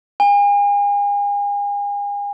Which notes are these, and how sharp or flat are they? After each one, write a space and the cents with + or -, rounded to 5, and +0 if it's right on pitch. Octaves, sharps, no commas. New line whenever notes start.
G#5 -40